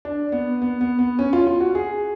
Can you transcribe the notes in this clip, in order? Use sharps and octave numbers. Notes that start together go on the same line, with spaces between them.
D4
B3
B3
B3
B3
C#4
F4
F4
F#4
G#4